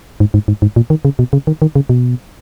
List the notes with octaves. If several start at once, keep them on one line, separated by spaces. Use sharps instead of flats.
G#2
G#2
G#2
G#2
A#2
D#3
C#3
B2
C#3
D#3
D#3
C#3
B2